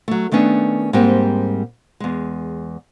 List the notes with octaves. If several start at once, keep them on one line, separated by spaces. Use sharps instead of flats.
F#3 A3
D#3 A3 B3 C#4 D4
G#2 G3 A#3 C4 G4
E2 G#3